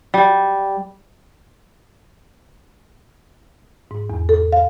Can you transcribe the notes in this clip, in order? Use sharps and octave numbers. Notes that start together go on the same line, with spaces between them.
G3
G#2
E2
A4
F5